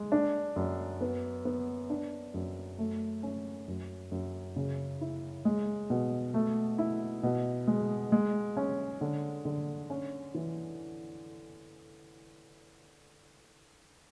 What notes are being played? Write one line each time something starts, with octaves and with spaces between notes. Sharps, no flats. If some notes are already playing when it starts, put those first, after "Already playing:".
Already playing: G#3
D4
F#2
B3
B3
D4
F#2
A3
C#4
F#2
F#2
C#3
E4
G#3
B2
A3
E4
B2
G#3
G#3
C#4
D3
D3
C#4
E3